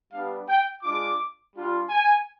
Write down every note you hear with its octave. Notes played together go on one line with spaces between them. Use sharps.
G3 B3 D4 G4 F5
G5
G#3 D4 F4 D6
G3 D4 F4
G#5